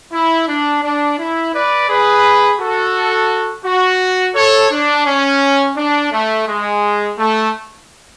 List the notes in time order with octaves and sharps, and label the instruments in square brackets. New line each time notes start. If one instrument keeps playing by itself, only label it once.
[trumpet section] E4
D4
D4
E4
B4 D5
G#4 B4
F#4 A4
F#4
A4 C#5
D4
C#4
D4
A3
G#3
A3